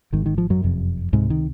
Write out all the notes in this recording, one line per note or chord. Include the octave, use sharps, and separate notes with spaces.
G#1 G#2 D#3
D#3
F3
F#2 F#3
F1 F2 C3
C#2 G#2 C3 G#3
D#3